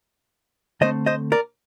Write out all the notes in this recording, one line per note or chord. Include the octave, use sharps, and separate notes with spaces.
D3 A3 C4 C5 D#5
C5 D#5
A#4 D5